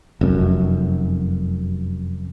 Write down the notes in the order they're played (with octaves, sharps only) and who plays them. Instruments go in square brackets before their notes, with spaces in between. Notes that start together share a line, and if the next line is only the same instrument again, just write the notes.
[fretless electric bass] F1 F#2